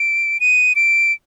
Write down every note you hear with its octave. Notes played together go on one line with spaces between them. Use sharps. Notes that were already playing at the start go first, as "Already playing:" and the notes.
Already playing: D7
D#7
D7